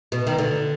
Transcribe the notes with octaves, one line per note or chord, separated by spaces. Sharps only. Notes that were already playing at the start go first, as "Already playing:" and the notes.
B2
D#3
D3